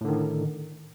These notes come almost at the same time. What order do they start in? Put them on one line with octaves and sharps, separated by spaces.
A2 D3 D#3